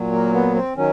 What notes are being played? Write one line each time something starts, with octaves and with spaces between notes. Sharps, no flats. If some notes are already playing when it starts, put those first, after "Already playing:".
Already playing: A#2 F#3
A#3
B3
C4
D#3 F#3 C#4